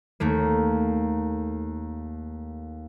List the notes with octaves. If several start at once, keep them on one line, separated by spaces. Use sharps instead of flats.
D#2 A3 A#3